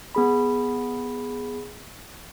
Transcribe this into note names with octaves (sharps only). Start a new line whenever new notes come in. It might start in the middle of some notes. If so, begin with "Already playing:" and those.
B3 G#4 B5